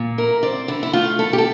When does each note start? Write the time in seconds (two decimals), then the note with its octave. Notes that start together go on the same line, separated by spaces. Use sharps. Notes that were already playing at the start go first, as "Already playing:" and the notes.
Already playing: A#2
0.18 E4 A#4
0.43 C4 D5
0.68 D3 E4
0.83 E4
0.93 A3 F4
1.19 E4 A4
1.33 G4
1.38 A4